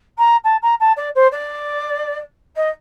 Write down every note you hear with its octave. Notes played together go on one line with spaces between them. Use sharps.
A#5
A5
A#5
A5
D5
C5
D5
D#5